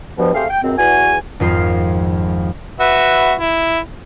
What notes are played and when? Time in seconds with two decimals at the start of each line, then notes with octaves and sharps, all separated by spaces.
0.18 G2 B2 F3
0.34 A3 C4 G4 G#4 C5 F5
0.49 G5
0.63 C#2 F#2 C4
0.78 E2 F#4 G#5
1.40 G#1 F2 F4 C7
2.80 F#4 B4 E5
3.39 E4